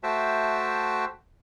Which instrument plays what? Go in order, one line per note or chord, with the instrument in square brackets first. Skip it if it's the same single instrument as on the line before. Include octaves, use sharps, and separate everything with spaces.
[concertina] A3 F#4 C5 E5 G5 A5